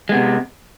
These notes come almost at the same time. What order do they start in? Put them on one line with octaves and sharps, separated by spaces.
G#3 B3 C3